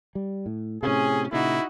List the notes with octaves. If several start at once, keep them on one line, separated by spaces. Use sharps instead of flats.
G3
A2
A2 C3 C#4 G#4
A#2 C#3 D#4 E4 F#4